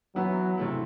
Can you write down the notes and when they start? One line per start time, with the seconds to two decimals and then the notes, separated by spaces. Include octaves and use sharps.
0.15 E3 F#3 B3 E4
0.58 C3 E3 A3 E4